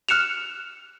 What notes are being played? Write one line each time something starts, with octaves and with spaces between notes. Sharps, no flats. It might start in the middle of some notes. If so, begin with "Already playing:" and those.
F6 F#6 C#7 E7 F7